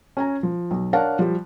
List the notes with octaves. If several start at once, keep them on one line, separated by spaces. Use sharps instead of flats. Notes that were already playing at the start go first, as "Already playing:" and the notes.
C#4 G#5 A#5
F3
B1
D4 A#4 C#5 F5 F#5 A5
F3 G3